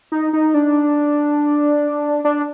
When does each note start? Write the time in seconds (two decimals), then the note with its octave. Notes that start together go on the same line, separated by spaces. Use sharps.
0.12 D#4
0.33 D#4
0.54 D4
2.25 D4